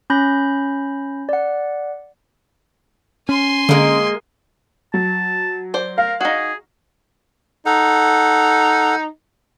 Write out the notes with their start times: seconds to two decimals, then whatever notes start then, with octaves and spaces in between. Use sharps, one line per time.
0.10 C#4 B5 G6 A#6
1.29 D5 F#5
3.29 C#4 G#5 C6
3.69 D3 G#3 A#3
4.94 F#3 A5
5.74 C5 D5
5.98 A#4 F5
6.21 D#4 F#4 G#4
7.66 D#4 A4 F#5